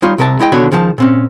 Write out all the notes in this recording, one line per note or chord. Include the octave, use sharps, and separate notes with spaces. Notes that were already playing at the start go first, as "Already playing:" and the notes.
G3 D#4 F4 C#5
C2 C3 A#4 E5 A5
G#3 E4 D#5 G5
D#2 B2 D3 F#4 C#5 B5
C#2 D#3 F3 G4 A5
A#2 C4 C#4